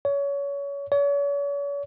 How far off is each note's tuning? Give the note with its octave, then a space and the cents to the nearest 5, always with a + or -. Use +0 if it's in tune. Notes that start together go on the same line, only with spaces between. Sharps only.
C#5 +25
C#5 +40